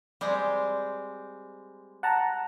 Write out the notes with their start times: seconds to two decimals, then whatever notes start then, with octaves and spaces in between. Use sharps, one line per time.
0.21 G3 G#3 C4
2.03 F#5 A5 A#5